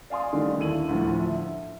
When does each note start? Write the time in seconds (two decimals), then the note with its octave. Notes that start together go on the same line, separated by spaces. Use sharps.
0.10 D5 F5 G#5 C6 D#6
0.33 D3 D#3 G3 A3
0.58 D#2 E4 A4 D#7 F#7
0.89 D2 A2 F3
1.19 E5